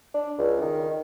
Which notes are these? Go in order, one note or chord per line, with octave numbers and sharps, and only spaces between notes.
D4
C#2
D#3